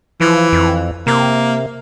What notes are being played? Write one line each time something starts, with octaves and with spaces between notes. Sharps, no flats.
E3 F3
F2
C3 A#3